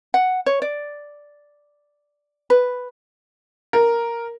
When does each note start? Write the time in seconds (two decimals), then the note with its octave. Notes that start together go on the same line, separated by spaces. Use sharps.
0.14 F#5
0.46 C#5
0.62 D5
2.50 B4
3.73 A#4